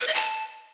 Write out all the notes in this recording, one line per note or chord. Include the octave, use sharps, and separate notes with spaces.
B4
D#5
A5